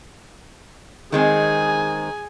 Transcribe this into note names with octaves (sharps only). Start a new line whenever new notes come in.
D#3 G#3 C4 G#4 G#5